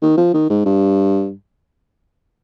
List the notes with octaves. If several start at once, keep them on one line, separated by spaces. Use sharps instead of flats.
D#3
F3
D#3
G#2
G2